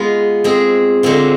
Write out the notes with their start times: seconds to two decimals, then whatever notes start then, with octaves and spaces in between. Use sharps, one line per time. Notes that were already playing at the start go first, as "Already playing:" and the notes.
Already playing: G#3 B3 F4 G#4
0.44 G#3 C4 G#4
1.03 D3 G#3 C4 F4